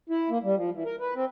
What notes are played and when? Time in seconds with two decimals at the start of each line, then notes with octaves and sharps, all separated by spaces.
0.10 E4
0.30 A#3
0.44 G3
0.56 F3
0.74 E3
0.85 A#4
1.00 B4
1.15 C4